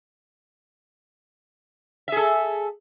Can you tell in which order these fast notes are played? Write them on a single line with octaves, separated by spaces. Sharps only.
E5 G#4 A4